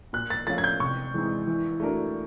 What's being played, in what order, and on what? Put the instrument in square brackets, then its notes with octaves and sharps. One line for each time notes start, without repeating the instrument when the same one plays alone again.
[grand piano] A#2 [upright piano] F#6
[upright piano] A6
[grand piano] F3 A3 C#4 F4 [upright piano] A6
[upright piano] G#6
G6
[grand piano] C3 [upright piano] C#6
[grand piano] E3 G#3 C4 D#4
E3
A3 D4 F#4 A#4